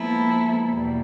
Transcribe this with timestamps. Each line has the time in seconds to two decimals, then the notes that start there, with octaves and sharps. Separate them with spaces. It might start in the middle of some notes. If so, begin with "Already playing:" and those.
Already playing: F3 G#3 A#3 B3 E4 A4
0.69 E2 B2 G3